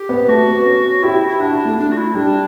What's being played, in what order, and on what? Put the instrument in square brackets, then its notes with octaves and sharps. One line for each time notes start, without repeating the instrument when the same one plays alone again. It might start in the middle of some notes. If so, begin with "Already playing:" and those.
Already playing: [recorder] G4
[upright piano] B3
[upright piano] A3 [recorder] F#4
[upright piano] B3
C#4
[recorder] E4 [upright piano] G4
[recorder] E4
[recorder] D4 [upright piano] F#4
[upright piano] E4
A3
[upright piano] A3 [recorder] D4
[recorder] F#4
E4
[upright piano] G3 [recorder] D4